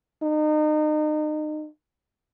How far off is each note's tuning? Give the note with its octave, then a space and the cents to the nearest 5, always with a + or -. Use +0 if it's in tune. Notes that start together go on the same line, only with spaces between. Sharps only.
D#4 -35